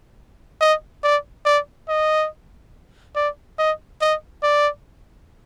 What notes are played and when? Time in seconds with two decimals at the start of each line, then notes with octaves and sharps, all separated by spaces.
0.61 D#5
1.04 D5
1.46 D5
1.89 D#5
3.16 D5
3.58 D#5
4.01 D#5
4.43 D5